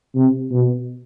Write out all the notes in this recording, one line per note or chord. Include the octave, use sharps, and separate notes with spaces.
C3
B2